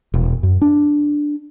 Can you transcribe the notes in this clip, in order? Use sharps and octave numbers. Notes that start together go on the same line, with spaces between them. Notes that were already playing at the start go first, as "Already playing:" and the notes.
E1
F#2
D4